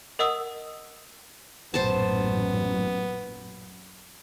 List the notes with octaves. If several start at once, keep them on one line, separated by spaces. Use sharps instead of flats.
A#4 D#5 F#5 D#6 E6
A1 F#2 A#2 B3 C5 A5